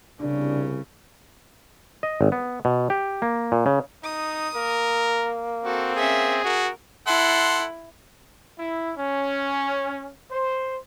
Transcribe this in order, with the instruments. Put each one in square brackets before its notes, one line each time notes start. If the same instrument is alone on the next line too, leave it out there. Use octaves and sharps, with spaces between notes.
[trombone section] C2 [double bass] C#3 [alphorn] D4
[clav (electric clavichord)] D#5
G#1
B3
B2
G4
A#3
A#2
C#3
[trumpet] D#4 [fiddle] D#6
[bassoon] A#3 [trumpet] A#4
[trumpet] C4 [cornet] F#4 [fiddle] A4
[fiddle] C#4 E5 [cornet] G#4
[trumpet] F#4 [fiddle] A#4
[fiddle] E4 [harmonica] A4 F#5 C6
[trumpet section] E4
C#4
C5